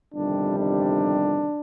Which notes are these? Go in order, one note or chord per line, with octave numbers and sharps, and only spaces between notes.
G1 F2 C3 D#3 G3 D4
D4